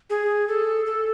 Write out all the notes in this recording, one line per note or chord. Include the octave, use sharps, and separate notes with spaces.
G#4
A4
A4